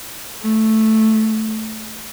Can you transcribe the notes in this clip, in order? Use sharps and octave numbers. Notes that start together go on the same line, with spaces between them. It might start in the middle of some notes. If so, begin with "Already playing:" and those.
A3